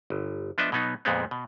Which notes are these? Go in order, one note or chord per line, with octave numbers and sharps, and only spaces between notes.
G1
F3 B3 D4 D#5 E5
B2 F#3 B3 D#4
F2 A#2 G#3 B3 C4
B2